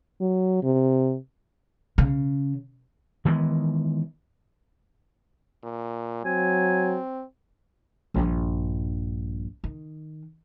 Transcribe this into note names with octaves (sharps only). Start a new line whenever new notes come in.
F#3
C3
C#3
D#3 E3 G#3 B3
A#2
F#3 C4 G#5
A#1 G2
D#3